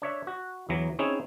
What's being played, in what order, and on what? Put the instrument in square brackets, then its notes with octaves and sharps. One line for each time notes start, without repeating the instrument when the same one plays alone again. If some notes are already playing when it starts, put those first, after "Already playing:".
[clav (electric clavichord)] D4 C#5 E5
F#4
E2 E3 F#3 A#5
C4 C#4 D#4 E4 G#4 C#5